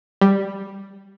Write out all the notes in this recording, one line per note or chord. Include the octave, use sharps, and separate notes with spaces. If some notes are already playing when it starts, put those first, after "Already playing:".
G3